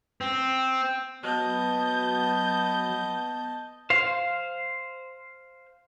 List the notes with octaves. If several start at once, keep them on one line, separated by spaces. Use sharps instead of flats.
C4
F#3 B3 D#5 A5 G6
C5 F5